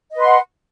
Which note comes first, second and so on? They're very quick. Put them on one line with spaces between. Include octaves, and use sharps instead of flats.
D#5 B4 C6 F#5